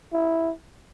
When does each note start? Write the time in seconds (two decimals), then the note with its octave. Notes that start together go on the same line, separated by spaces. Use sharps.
0.13 E4